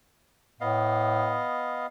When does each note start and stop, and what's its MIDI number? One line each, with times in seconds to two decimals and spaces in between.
0.61 1.41 45
0.61 1.86 59
0.61 1.86 75
0.61 1.86 77